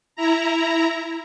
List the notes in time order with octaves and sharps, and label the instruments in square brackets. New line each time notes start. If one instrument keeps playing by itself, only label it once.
[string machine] E4 A#5